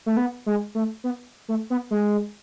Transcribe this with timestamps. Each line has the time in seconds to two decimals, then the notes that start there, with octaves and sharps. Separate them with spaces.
0.06 A3
0.17 B3
0.46 G#3
0.75 A3
1.04 B3
1.48 A3
1.70 B3
1.91 G#3